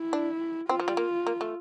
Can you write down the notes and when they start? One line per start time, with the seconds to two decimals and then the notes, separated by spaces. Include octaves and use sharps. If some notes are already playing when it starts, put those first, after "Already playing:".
Already playing: E4
0.13 D4
0.69 C4 F4
0.80 F3
0.88 G3
0.97 A#3
1.27 A#3
1.41 A3